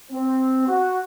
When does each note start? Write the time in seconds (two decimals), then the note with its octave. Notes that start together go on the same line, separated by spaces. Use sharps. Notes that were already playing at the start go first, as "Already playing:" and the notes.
0.11 C4
0.67 F#4